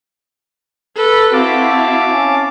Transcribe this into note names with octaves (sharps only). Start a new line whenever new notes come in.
A4 B4
C4 E4 F#4 F5 A5 D6
C#4